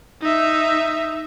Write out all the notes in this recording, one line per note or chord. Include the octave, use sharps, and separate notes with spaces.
D#4 E5